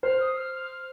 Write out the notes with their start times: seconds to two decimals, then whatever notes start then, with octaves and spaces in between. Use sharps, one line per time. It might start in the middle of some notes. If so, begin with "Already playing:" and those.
0.03 C5 F6
0.20 D#6
0.37 F6
0.54 F6